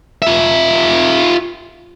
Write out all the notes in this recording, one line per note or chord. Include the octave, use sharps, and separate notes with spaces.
F4 E5